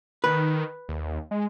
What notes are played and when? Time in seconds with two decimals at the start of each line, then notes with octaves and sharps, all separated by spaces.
0.24 D#3 B4
0.89 D#2
1.31 G#3